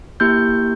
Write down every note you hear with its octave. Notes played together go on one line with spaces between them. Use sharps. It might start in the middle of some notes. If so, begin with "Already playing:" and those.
A#3 E4 G4 G6